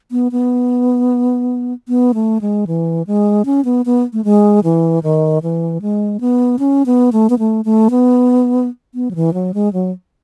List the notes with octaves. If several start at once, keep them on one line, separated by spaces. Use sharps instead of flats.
B3
B3
B3
A3
G#3
E3
G#3
C#4
B3
B3
A3
G#3
E3
D#3
E3
G#3
B3
C#4
B3
A3
B3
A3
A3
B3
B3
F#3
E3
F#3
G#3
F#3